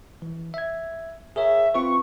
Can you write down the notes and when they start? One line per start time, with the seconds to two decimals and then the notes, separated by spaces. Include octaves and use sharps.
0.22 E3
0.54 E5 G#6
1.36 G#4 A#4 C#5 E5
1.74 C4 F4 B4 C#6